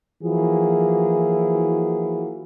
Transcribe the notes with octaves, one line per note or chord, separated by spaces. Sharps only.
E3 F3 A#3 E4 F#4 G#4